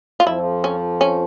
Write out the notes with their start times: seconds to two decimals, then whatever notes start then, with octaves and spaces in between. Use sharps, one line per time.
0.20 F4
0.27 F2 F3 E4
0.64 C#4
1.01 C#4